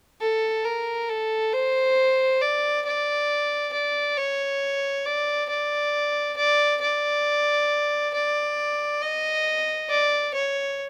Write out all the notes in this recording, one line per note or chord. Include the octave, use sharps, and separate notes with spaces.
A4
A#4
A4
C5
D5
D5
D5
C#5
D5
D5
D5
D5
D5
D#5
D5
C#5